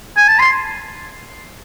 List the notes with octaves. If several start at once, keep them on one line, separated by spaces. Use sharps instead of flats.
G#5
A5
C6